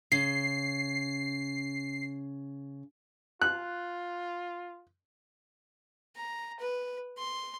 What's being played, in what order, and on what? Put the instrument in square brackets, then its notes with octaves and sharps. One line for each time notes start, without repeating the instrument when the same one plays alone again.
[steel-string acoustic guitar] C#3 [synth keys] C7
[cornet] F4 [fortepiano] F#6
[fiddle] A#5
B4
C6